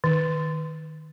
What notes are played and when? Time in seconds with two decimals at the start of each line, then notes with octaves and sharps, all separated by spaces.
0.04 D#3